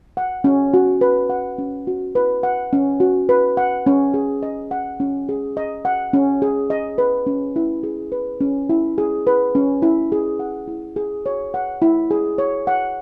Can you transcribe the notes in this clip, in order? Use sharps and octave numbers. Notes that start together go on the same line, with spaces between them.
F#5
C#4
F#4
B4
F#5
C#4
F#4
B4
F#5
C#4
F#4
B4
F#5
C#4
G#4
D#5
F#5
C#4
G#4
D#5
F#5
C#4
G#4
D#5
B4
C#4
E4
G#4
B4
C#4
E4
G#4
B4
C#4
E4
G#4
F#5
E4
G#4
C#5
F#5
E4
G#4
C#5
F#5